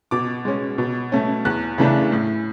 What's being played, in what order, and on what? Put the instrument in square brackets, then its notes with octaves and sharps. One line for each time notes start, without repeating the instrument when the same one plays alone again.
[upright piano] B2 D6
G#3 C#4
B2
A3 C#4
E2 F#6
C#3 E3 A3 D4
A2